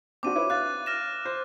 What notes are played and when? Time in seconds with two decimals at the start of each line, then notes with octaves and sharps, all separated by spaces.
0.23 C4 D4 F#4 D6 D#7
0.35 E4 B4 C#5
0.50 F5 F#6 A6
0.86 F6 A#6 E7
1.25 C5